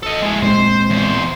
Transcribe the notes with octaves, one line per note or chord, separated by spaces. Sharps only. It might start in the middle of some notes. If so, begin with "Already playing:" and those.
A4 D#5
G#3 E4
A#2 G#3 C4 C5
E2 C5